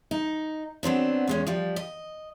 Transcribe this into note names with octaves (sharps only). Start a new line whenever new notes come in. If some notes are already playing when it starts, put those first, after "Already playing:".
D#4
F#3 B3 C4 D4
E2 G#3 C#4
F3 G3
D#5